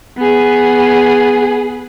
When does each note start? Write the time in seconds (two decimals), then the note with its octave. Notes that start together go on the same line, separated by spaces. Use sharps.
0.18 B3 G#4